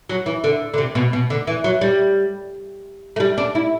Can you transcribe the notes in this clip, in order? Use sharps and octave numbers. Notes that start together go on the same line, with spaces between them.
F#3
E3
D3
D3
C3
B2
B2
D3
E3
F#3
G3
A3
G3
D4
E4